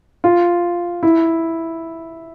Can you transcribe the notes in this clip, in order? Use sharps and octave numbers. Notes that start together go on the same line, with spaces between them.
F4
E4